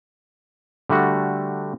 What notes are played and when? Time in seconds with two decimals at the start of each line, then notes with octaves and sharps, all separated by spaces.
0.89 D3 G3 A3 F#4